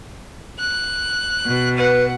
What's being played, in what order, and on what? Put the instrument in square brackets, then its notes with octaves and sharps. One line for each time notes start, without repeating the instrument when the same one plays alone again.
[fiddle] F#6
[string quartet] B2
[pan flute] B4 [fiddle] F#5